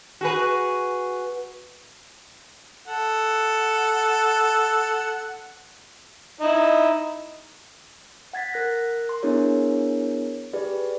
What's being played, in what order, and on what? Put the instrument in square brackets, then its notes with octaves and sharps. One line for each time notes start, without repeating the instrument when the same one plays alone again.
[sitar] F#4 G#4 B4
[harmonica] A4 F#5
D#4 E4
[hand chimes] F#5 G#6 A6 B6
A#4 F#6 A#6
C6
B3 D4 E4 G#4 A#4 C#5
G4 G#4 B4 D5